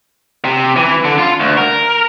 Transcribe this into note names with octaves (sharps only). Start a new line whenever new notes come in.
C3
E3
D3
F4
D2
A#4